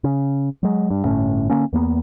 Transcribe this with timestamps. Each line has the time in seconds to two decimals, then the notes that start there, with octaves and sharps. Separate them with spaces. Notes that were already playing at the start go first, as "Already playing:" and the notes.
0.04 C#3
0.63 F#3 G#3
0.90 G2
1.05 G1 A2 C#4
1.50 D3 A#3 C#4
1.73 E2 A#3 B3